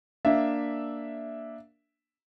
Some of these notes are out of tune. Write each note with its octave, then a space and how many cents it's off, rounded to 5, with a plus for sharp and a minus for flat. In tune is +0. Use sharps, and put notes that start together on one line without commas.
A#3 +0 D4 +0 E5 -5